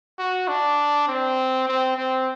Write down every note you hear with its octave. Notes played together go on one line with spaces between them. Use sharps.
F#4
D4
C4
C4
C4